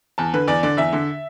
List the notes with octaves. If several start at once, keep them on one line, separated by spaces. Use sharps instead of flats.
E2 A5
D3 B4
E2 D5
D3 D5
E2 E5
D3